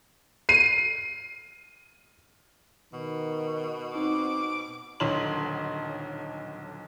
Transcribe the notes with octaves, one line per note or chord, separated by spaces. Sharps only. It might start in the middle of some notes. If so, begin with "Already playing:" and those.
C7 D#7
B2 D#3
C4 D#4 D6
D#1 B1 D3 C#5 C6 F#7